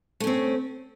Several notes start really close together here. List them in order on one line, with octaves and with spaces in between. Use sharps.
A3 C#4 C4